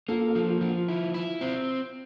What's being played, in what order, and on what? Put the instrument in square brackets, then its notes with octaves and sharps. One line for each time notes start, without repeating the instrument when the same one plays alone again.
[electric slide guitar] A#3 [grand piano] F4 A4
[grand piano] F4 A4
[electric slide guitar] F3
[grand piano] F4
[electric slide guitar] F3
[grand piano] F4
[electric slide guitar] E4
E4
C4